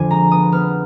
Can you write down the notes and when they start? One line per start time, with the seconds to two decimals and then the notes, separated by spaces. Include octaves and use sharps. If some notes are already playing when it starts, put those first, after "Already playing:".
Already playing: F2 D3 F3 G#5 D6
0.11 G#3 A#5
0.31 B3 D#6
0.52 B3 F6